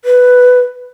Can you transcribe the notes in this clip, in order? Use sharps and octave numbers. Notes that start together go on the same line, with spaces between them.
B4